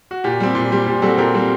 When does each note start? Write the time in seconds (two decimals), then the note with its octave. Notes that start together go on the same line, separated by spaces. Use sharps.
0.11 F#4
0.24 A#2 G4
0.40 G3 C4
0.55 A#2
0.72 G3 C4
0.86 A#2 G4
1.02 G3 C4 F#4 A4
1.18 A#2 G4 A#4
1.34 G3 C4